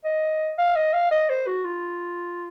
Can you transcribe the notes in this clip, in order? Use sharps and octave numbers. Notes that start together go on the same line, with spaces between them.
D#5
F5
D#5
F5
D#5
C5
F#4
F4